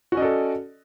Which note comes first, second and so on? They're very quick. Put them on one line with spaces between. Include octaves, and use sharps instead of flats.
F#4 C#4 D#5 D5 A4